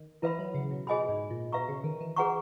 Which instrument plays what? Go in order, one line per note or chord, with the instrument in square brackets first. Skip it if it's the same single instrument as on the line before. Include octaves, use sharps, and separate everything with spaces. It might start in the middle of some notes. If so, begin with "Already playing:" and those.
Already playing: [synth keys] D#3
[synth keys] E3 [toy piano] E4 B4 E5 B5
[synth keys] F#3
C#3
B2
[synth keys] B2 [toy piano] G#4 D#5 G#5 B5
[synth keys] G#2
A#2
[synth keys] B2 [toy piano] B4 E5 A#5 C#6
[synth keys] C#3
D#3
E3
[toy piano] G#4 B4 F#5 A#5 C#6